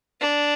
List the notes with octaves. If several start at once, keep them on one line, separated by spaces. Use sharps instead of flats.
D4